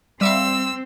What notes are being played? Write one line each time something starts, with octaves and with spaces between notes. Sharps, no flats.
G3 C4 E5 F5 E6